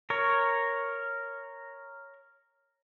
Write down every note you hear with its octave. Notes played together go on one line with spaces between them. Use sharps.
A#4 C#5